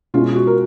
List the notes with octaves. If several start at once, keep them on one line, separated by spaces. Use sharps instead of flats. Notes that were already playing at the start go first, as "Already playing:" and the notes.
B2 G#3 C#4 E4 F4
F#4
A#4